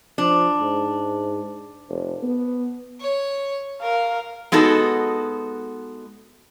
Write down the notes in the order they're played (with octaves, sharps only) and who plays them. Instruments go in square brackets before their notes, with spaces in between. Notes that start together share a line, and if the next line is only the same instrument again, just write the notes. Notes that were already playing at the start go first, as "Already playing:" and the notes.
[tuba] F3 [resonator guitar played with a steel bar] D4
[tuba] G#2
F1
B3
[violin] C#5
[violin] A#4 [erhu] F5
[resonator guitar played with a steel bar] G#3 B3 D#4 F#4 A4